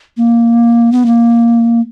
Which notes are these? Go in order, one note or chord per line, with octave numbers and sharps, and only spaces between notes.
A#3
B3
A#3